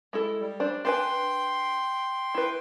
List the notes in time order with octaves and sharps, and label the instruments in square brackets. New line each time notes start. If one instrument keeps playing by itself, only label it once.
[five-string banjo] G#3 E4 A4
[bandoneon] G3
[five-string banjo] D4 C5
[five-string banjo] D4 B4 G#5 [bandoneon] G5 C6
[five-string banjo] E4 B4